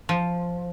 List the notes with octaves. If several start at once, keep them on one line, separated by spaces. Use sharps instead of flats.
F3